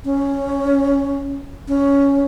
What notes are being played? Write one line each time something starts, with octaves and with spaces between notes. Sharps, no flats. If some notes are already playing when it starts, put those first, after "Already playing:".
C#4
C#4